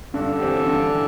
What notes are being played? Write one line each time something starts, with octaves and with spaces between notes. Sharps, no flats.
G2 D3
E3 C4 G4
G2
E3